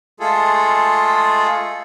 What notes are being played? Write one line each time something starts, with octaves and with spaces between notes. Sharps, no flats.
G#3 A3 F4 G#4 A4